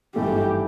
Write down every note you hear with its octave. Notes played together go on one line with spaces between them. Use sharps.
G#1 G2 E3 A3 G4